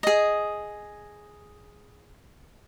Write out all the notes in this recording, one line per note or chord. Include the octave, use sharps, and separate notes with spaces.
G#4 D#5